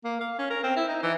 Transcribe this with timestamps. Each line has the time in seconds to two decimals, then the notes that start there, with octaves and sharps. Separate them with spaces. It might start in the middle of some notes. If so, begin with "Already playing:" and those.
0.05 A#3
0.21 F5
0.39 C#4
0.50 A#4
0.64 C4
0.76 E4
0.88 D#4
1.03 E3